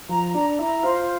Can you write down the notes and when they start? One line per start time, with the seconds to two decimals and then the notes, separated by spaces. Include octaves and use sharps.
0.09 F3 A#5
0.34 D4 A#5
0.58 E4 A#5
0.82 F4 C5